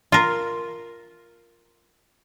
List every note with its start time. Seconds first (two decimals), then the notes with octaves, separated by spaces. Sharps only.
0.12 F4 A#4